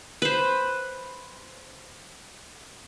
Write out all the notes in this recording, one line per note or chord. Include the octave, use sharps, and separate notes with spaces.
B4 C5